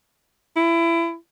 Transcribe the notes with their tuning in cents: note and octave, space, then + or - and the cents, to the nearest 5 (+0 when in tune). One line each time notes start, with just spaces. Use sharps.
E4 +25